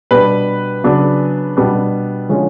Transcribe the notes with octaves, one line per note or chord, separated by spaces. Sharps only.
B2 G3 B3 D4 B4
C#3 F#3 B3 D4
B2 G3 B3 D4
D3 F3 G#3 C#4